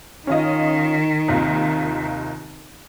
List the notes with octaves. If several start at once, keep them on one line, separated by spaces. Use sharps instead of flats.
D#3 C#4 F4 D#5
D#2 C3 F4